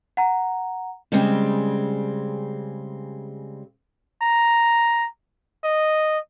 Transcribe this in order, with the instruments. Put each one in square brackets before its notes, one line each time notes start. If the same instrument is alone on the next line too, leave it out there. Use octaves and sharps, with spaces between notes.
[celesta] F#5 A#5
[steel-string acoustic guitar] C#3 G3 G#3 C4
[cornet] A#5
D#5